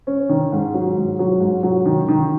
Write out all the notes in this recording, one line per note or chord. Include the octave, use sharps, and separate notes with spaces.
C#4
D#3
G#2
F#3
G#2
F#3
G#2
F#3
D#3
D#3